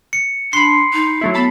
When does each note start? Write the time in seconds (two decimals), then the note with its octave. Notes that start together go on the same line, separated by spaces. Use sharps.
0.13 C#7
0.53 D4 B5 C6 C7
0.94 D#4
1.21 F#3 A3 E4
1.35 B3 A5 B5